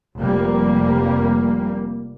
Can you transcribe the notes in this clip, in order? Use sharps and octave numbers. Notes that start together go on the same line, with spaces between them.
F1 G3 A#3